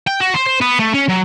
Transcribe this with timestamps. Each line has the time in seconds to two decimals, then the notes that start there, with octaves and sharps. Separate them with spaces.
0.07 G5
0.21 F#4
0.34 C5
0.47 C5
0.61 B3
0.80 A3
0.94 C#4
1.09 F#3